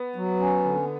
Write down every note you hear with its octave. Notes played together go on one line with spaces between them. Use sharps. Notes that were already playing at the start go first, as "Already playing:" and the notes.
Already playing: B3
F#3
C#4
D3